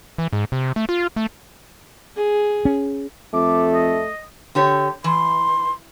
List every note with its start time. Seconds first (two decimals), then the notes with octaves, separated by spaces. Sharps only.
0.18 E3
0.33 G#2
0.52 C3
0.76 A3
0.89 F4
1.16 A3
2.16 G#4
2.65 C#4
3.34 F2 A3 D6
3.74 D#5
4.55 D3 G4 C#5
5.04 E3 C6